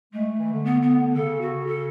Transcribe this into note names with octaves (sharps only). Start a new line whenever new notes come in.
G#3 A3
E3
D3
B3
B3
C#3 A4
F#4
A4